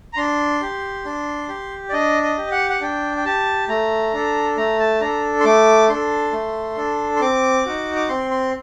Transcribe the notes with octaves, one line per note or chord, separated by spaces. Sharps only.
A#5
D4 C6
G4
D4
G4
D5
D4 D#5
D#5
G4
F#5
F#5
D4 G5
G5
G4 A5
A3 A#5
D4 A4
A3 A#5
A5
D4 A4 A#5
C6
A3 D6
D4 A4 C6
A3
D4 A4
C6
C4 D6
D#4 F#4
D6
C4 C6
C6